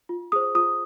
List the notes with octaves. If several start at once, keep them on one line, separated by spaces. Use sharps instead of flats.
F4
G#4 C5 D#6
F4 D#6